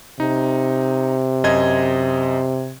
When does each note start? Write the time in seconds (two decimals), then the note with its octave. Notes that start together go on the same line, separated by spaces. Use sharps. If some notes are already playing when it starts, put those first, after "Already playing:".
0.20 C3 D#4
1.44 F#2 D#5 G#6